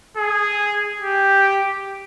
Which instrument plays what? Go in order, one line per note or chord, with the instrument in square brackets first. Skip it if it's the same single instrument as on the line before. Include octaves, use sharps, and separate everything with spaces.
[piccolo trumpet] G#4
G4